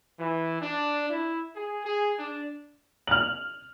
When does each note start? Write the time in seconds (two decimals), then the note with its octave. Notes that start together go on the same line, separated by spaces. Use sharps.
0.19 E3
0.62 D4
1.10 E4
1.55 G#4
1.85 G#4
2.19 D4
3.07 F6 F#7